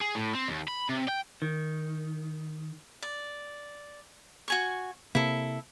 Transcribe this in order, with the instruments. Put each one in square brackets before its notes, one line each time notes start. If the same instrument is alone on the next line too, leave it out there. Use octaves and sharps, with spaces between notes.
[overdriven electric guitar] G#4
A2
C4
D#2
B5
C3
G5
[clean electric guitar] D#3
[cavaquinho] D5
F#4 G#5 C#6
[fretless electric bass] C3 A#3 [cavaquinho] E4 A4